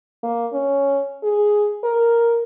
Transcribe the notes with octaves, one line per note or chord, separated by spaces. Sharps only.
A#3
C#4
G#4
A#4